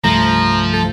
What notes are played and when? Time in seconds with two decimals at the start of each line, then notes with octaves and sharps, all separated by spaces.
0.04 C2 G2 F3 A3 A#5
0.73 A4